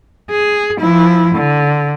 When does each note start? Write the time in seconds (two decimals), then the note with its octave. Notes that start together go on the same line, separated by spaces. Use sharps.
0.31 G#4
0.80 F3 E4
1.35 D3